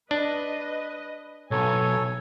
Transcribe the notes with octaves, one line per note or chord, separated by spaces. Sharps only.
D4 B4 D#5
B1 A4 C#5 G#5